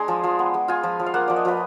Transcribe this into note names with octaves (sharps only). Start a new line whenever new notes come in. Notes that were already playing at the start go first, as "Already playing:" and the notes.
Already playing: G#3 D4 G#5 A#5
F3
F3
B3
G#3
F4 G#5
F3
F3
F5
A#3 F#5
F3 D5
D#5
F3 B4